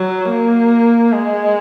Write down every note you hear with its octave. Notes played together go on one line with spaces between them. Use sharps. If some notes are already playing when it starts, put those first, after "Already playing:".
Already playing: F#3
A#3
G#3